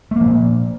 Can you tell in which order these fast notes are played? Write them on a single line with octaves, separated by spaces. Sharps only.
A3 A#3 F3 A#2